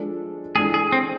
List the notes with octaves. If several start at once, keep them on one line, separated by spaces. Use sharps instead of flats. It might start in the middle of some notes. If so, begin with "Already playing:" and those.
Already playing: F3 G#3 D4 A4
E3 G#3 D4 G#4 A4
G#4
C4